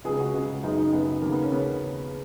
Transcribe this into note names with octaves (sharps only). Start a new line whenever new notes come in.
C#2 C#3 G#4
F#4
C#2 C#3
F#2 C#3 D#4
D#4
F#2 C#3 B3
D#2 C#3 A#3
B3
C#4
C#3 B3